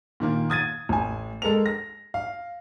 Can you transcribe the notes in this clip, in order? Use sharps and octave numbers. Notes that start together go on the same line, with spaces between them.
A#2 D#3 A#3
D#6 G#6 A6 D#7
A1 G#5
G#3 A4 A#4 F7
A#6
F5